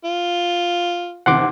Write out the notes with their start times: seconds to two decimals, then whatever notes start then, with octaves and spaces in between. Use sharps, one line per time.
0.04 F4
1.26 A1 D#2 C3 F#5 C6 D6